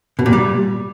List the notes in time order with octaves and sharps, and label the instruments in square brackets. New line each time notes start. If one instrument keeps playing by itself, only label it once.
[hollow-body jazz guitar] B2
A#2
G3